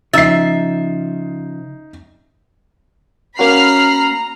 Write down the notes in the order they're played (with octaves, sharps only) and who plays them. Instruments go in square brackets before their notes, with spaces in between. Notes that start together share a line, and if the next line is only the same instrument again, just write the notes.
[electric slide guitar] C#3 F3 [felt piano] D#4 C7 [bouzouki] E5 [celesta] E6 A6
[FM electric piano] A#3 C#4 F#4 [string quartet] A#5 [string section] B5 F6 C7